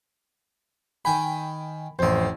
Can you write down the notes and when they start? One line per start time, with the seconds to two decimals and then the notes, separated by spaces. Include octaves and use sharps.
1.05 D#3 G5 G#5 B5
1.99 A1 F2 C4 C5